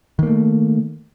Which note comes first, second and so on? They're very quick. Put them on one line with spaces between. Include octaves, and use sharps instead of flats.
D#3 A#3 A3